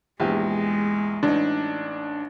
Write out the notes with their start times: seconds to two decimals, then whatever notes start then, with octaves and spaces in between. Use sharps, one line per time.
0.20 A#1 E2 G#3 G4
1.23 A1 D4 D#4